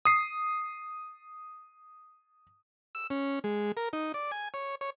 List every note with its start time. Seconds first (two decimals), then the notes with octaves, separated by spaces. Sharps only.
0.05 D#6 C7
2.95 E6
3.10 C#4
3.44 G#3
3.77 A#4
3.93 D#4
4.14 D5
4.31 G#5
4.54 C#5
4.81 C#5